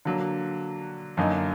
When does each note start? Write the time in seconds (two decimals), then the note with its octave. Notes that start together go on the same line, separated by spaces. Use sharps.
0.05 D3 F#3 A#3
1.17 F#2 D3 F#3 A#3 D#4